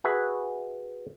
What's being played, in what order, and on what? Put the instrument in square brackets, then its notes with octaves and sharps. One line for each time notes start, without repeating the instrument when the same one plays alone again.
[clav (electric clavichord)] F#4 G#4 B4 E5